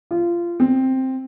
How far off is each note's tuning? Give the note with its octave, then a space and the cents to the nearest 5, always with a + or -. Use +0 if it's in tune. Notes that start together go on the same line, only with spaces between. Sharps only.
F4 -20
C4 +5